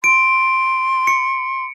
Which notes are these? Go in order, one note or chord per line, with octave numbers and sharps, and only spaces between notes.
C6 D7
C#7